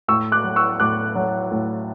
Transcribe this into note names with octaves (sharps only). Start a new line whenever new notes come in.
A2 C#6 E6
D6 F#6
F#3
C#6 E6
A2 D6 F#6
F#3
A2